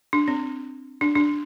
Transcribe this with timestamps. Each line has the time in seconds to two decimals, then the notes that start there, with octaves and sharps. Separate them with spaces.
0.13 D4
0.28 C4
1.01 D4
1.16 D4